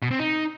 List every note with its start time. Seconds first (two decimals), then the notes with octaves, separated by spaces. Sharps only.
0.02 B2
0.11 C4
0.20 D#4